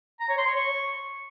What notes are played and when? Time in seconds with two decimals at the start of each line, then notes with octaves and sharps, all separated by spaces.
0.20 A#5
0.29 C#5
0.38 C6
0.47 C#5
0.56 C#6